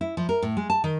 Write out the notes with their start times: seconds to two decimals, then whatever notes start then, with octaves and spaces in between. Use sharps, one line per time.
0.01 E4
0.17 F3
0.29 A#4
0.42 A2
0.57 G#3
0.70 A5
0.84 D#3